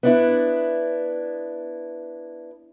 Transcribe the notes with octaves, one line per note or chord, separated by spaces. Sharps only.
B3 D4 E4